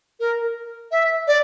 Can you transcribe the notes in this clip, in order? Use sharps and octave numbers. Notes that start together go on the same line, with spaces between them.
A#4
E5
D5